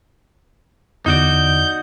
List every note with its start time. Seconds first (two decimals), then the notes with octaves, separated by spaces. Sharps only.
1.06 E2 D3 D#4 F#4 D5 G6